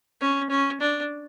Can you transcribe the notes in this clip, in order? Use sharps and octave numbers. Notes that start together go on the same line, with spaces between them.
C#4
C#4
D4